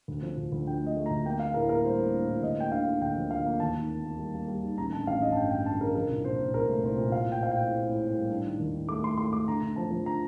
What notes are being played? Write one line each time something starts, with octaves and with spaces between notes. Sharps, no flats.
D2
F3
D2
D2
D3 G5
A3
D#5
A3
A#5
D2
A#3 G5
A#3 F5
A2 A#4
A#3 A#4
G3 C5
A#3
D4
A2
D2 D#5
A#3 G5
D3 F5
D3
D2 G5
F3
D2 F5
A#3
D#2 A5
D#3
A#3
A#3
G3
A#3
G3
D#3
A1 A#5
D3 A5
A1 F5
A1 D#5
A5
G2 G5
G2 G5
D3 A5
D3 A#4
F3 A#4
C2
A#2 C5
A#2
C2 A#4
A3
C2 C5
A#2
A2 F5
A2
G5
C4 F5
G5
A2
C4
A2
A2
G3
D4
D#3
D#2
D#3
A3 D6
A3 C6
A3 C6
A3 D6
D3 A#5
D3
F3 A5
F3
D3 A#5